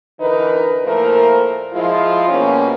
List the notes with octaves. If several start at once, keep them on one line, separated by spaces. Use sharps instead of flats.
D3 E3 D#4 A#4 B4
A#2 F3 A3 E4 A#4
F3 G#3 E4 F4
B2 F3 G3 A#3 C#4